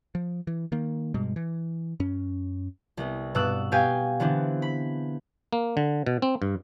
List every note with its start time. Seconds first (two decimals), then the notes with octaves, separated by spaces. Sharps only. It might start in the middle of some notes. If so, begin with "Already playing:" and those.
0.15 F3
0.47 E3
0.72 D#3 A#3
1.14 G2 B2 G3 G#3
1.36 E3
2.00 F#2 C#4
2.97 C2 B3
3.35 G2 B2 B3 D6 E6 F#6
3.72 B2 G4 F5 G5 G#5 D#7
4.20 D3 E3 B3 C4 D4
4.62 B5
5.53 A#3
5.77 D3
6.06 B2
6.22 C4
6.42 G2